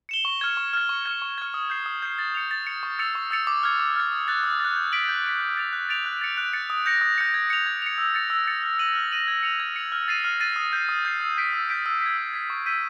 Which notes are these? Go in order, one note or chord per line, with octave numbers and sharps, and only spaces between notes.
C#7 E7 G7
C#6
F6 G#6
C#6
F6 G#6
C#6
F6 G#6
C#6
F6 G#6
D#6
G6 C7
D#6
G6 C7
A6
C#7 F7
A6
C#7 F7
C#6
E6 A6 C#7 F7
C#6
E6 A6 C#7 F7
D6
F6 G#6
D6
F6 G#6
D#6
F#6 A6
D#6
F#6 A6
G6
B6 D7 F#7
G6
B6 D7 F#7
F#6
A6 D7 F7
F#6
A6 D7 F7
F#6
A6 C#7
F#6
A6 C#7
D#6
G6 A#6 C#7
D#6
G6 A#6 C#7
G#6
C#7 F7
G#6
C#7 F7
E6
A6 C#7
E6
A6 C#7
F6
A#6 D#7 F#7
F6
A#6 D#7 F#7
G#6
C#7 F7
G#6
C#7 F7
F6
A6 C7 D#7
F6
A6 C7 D#7
D#6
G6 C7
D#6
G6 C7
E6
G6 B6 D7
E6
G6 B6 D7
E6
G#6 B6
E6
G#6 B6
C#6
E6 G6 B6 D#7